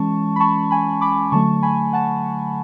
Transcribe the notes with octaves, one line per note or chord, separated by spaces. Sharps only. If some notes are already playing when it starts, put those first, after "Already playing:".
Already playing: E3 G#3 C#4 A5 C#6
B5
A5 C#6
G#5 B5
B5 D6
D3 F#3 A3 A5 C#6
G#5 B5
F#5 A5